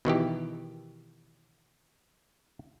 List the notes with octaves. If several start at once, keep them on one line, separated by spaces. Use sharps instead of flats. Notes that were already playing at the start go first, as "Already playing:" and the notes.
B2 D#3 E3 G4